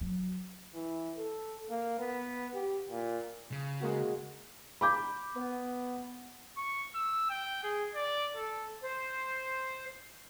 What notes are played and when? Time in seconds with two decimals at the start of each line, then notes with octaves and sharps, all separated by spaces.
0.01 F#3
0.75 E3
1.18 A4
1.70 A#3
1.99 B3
2.54 G4
2.90 A#2
3.52 C#3
3.80 G#3 A#3 F#4
4.81 B5 D6 G6
5.36 B3
6.57 C#6
6.95 E6
7.30 G5
7.64 G#4
7.95 D5
8.36 A4
8.83 C5